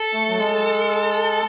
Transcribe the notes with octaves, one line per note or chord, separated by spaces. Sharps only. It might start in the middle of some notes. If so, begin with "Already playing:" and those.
Already playing: A4
A3
F#3
G#3